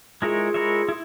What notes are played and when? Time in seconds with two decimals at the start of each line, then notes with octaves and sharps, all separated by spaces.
0.22 G#3 E4 F4 G#4 A#4 C#5 E5
0.54 G#3 E4 A#4 C#5 E5
0.89 E4